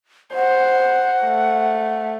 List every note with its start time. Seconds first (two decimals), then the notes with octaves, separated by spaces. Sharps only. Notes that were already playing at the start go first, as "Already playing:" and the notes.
0.34 C5 F#5
1.25 A3